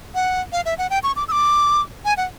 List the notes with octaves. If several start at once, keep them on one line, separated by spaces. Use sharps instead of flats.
F#5
F5
E5
F#5
G5
C#6
D6
E6
D6
G#5
F#5